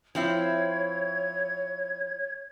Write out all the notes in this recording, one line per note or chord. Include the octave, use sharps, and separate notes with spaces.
F3 C4 E4 C#5 G#6